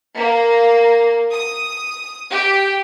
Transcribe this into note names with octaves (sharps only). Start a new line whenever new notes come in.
A#3
D#6
G4